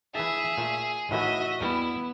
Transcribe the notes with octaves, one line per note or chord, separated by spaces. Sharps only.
E3 G#4 E5 A5
A#2 A3
A2 D#3 E3 F#4 D#5 E5
E2 G3 B3 E4